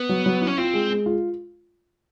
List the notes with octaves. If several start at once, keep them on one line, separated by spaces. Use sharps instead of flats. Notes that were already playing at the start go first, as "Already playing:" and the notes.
Already playing: B3
F#3
F#3
E4
C#4
C4 F4
G#3
G#3
F4